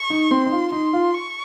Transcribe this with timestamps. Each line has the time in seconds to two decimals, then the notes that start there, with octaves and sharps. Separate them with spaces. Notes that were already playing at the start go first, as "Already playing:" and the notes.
Already playing: C#6
0.10 D#4
0.31 C4 C6
0.46 D#4
0.52 F4
0.72 D#4 C6
0.93 F4
1.14 C#6